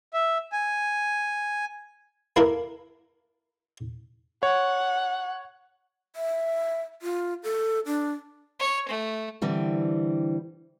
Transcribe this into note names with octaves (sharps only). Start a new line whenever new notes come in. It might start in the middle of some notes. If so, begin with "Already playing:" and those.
E5
G#5
A#3 E4 A4 A#4
C#5 F#5
E5
F4
A4
D4
C#5
A3
D3 E3 G3 C4